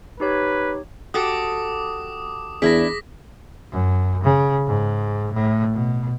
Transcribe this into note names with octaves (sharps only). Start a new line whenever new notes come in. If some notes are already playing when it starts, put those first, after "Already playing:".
D#4 G4 B4 C#5
F#4 G4 A4 D6 D#6
E2 D4 E4 G#4 A#6 B6
F#2
C#3
G#2
A2
B2